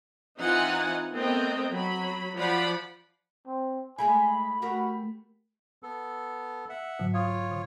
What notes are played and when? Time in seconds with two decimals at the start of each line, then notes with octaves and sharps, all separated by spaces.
0.38 E3 C4 D#4 F4 F#5 G#5
1.14 A3 B3 C4 A#4 D#5 G5
1.72 F#3 B5
2.37 F3 D5 F#5 B5
3.47 C4
3.98 G#3 A3 E4 G#5 B5
4.62 A3 F#4 G4 A#4
5.83 B3 A4
6.69 E5 F#5
6.99 G#2 D3 F#3
7.14 F4 C#5 F5 D#6
7.52 D3